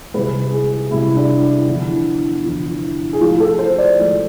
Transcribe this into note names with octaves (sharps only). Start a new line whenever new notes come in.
C2 C3 G#3 B4
G#4
C2 C3 G#3 E4
D4
E4
E2 D3 F3
E2 D3 F3
G#4
A2 F3 G#3 F4
A4
C5
D5
A2 F3 G#3